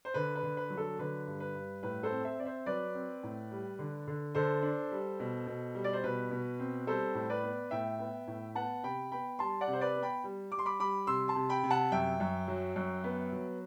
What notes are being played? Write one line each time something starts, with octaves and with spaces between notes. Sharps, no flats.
C5
D3 B4
B4
D3
B4
F#3
A4
D3 B4
G2
B4
G2
A2 B4
A4 C5
C4
C5 E5
C4 D5
C5 E5
F#3 B4 D5
C4
A2
G3
D3
D3
D3 A4 C5
D4
G3
B2
B2
G3
D5
C5
B2 B4
B2
C4
G3 A4 C5
A2
B4 D5
B3
A2 E5 G5
B3
A2
B3 F#5 A5
C3 G5 B5
B3 G5 B5
G3 A5 C6
D5 F#5
C3
C5
B4 D5
B3
G5 B5
G3
G3 D6
C6
B5 D6
G3 B5 D6
C3 C6 E6
A5 C6
C3
G5 B5
C3
F#5 A5
F#2 E5 G5
F#2
F#3
F#2
B3
F#3